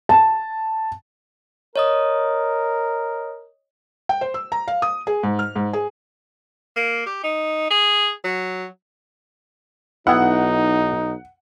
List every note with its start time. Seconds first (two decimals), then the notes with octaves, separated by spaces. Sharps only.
0.09 A5
1.76 A#4 C#5 D#5 D#6
4.09 G5
4.21 C5
4.34 E6
4.52 A#5
4.68 F5
4.82 D#6
5.07 G#4
5.23 G#2
5.39 F6
5.56 G#2
5.73 G#4
6.76 A#3
7.06 G4
7.23 D#4
7.70 G#4
8.24 F#3
10.07 B1 B3 D#4 E4 F#5